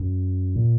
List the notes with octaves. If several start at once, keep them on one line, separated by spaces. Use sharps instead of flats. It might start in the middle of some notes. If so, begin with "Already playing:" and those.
Already playing: F#2
A#2